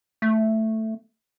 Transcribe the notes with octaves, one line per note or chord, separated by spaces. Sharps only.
A3